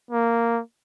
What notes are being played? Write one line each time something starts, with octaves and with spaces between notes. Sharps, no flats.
A#3